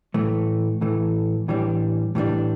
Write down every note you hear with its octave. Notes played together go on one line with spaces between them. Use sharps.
A2 E3 A3
A2 E3 A3
A2 E3 G3 D4
A2 E3 G3 D4